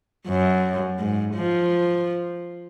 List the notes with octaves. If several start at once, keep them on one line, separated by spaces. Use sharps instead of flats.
F#2
G#2
F3